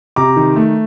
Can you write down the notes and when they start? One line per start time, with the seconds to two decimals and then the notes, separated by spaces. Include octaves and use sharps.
0.16 C3 A#5 D6
0.36 D#3
0.56 A3